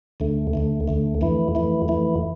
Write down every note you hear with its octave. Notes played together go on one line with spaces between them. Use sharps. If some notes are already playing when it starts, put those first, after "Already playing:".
D2 D3 A3
D2 D3 A3
D2 D3 A3
F2 E3 A3 E4
F2 E3 A3 E4
F2 E3 A3 E4